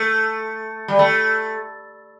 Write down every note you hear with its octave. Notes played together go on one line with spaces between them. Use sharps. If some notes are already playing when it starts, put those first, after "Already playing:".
Already playing: A3
G3
A3